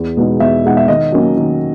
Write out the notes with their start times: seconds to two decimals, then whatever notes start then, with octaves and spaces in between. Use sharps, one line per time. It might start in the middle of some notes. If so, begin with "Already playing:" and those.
Already playing: E2
0.17 B2 G#3 B3 D#4
0.40 E2 E5
0.65 B2 G#3 B3 D#4 F#5
0.77 E5
0.88 D#3 D#5
1.12 F#3 A#3 C#4
1.37 D#3